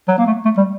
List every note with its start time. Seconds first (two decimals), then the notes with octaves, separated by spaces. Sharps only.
0.08 F#3
0.18 A#3
0.27 A3
0.45 A3
0.57 G3